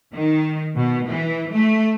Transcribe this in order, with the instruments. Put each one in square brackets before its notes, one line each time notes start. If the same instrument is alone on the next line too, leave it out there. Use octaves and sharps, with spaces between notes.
[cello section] D#3
B2
E3
A3